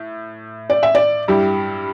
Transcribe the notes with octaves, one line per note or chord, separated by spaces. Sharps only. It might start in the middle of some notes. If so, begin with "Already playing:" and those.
Already playing: A2
D5
E5
D5
G2 G3 E4 G4